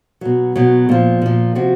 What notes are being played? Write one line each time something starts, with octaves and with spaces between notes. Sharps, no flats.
B2 F#3
B2 F#3
A#2 F3
A#2 F3
C3 F3 F#4